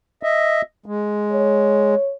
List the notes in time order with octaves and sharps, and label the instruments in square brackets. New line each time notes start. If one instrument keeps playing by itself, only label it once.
[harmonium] D#5 E5
G#3
[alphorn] C#5